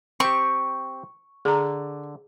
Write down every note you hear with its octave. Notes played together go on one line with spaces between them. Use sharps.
C4 G4 C#6
D3 G#4 A#5